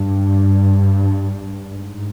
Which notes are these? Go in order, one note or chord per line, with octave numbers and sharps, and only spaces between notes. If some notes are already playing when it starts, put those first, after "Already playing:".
Already playing: G2
G#2